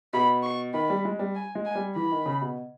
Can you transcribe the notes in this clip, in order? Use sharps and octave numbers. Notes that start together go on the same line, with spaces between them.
B2 B5
C#6
D#3 B5
G3
G#3
G3
G#5
G#3
G#5
G3
E3 B5
D#3
C#3
B2